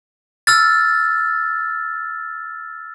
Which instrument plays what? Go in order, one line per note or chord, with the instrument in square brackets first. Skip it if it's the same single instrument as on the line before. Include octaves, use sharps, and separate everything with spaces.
[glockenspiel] E6 F6 A6